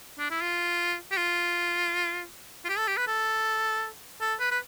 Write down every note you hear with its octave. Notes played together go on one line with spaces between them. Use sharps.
D4
E4
F4
G4
F4
F4
G4
A4
G4
B4
A4
A4
B4
B4